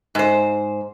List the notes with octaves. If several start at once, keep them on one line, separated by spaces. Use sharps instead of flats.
G#2 C5